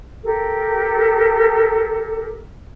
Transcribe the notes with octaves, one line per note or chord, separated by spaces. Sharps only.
G4 A4 A#4